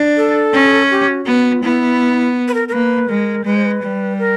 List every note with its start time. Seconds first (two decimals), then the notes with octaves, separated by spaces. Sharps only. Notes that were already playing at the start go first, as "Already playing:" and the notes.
Already playing: D4
0.17 A4
0.53 C#4
0.90 G4
1.08 F#4
1.26 B3 F#4
1.53 F4
1.63 B3 E4
2.48 B4
2.54 A#4
2.68 A#4
2.73 A#3 B4
3.09 G#3 A#4
3.45 G#3 B4
3.56 C5
3.66 B4
3.83 G3
4.19 A#4